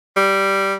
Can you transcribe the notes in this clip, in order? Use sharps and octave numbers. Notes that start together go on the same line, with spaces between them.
G3